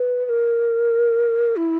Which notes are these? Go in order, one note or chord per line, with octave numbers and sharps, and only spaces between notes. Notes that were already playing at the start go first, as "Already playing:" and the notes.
Already playing: B4
B4
A#4
E4